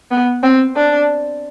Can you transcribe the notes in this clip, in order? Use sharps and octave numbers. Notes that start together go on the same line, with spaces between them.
B3
C4
D4